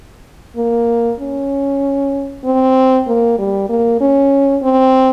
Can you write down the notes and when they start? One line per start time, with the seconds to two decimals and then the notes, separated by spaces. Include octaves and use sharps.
0.57 A#3
1.20 C#4
2.45 C4
3.08 A#3
3.39 G3
3.69 A#3
4.01 C#4
4.63 C4